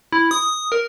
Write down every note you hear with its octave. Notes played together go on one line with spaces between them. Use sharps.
E4
D#6
A#4